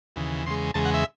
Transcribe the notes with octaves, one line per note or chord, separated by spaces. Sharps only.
D#2 C#3 E3
E2 C#3 G#3 C6
E2 C#3 G#3 A5
F#5
E5